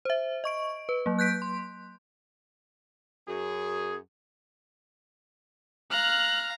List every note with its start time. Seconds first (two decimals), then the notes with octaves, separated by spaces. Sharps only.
0.05 C5 E5
0.44 D#5 C#6 D7
0.89 B4
1.06 F#3 A#3
1.19 F#6 G6 B6 D7
1.42 C6
3.28 F#2 G#4
5.91 F5 A#5 F6 F#6 F#7